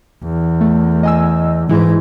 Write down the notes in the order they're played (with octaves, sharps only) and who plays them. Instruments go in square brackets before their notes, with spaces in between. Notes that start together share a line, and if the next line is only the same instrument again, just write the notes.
[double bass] E2
[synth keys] A3
D#5 G#5 E6
[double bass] G#2 G#3 [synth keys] E3 E4